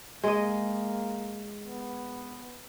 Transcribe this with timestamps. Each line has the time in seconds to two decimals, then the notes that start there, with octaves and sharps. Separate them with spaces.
0.23 G#3 A#3 D#5
1.64 B3